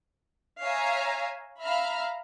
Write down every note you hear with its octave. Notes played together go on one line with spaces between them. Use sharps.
C#5 E5 F5 G#5 A#5
E5 F5 A#5 B5 F6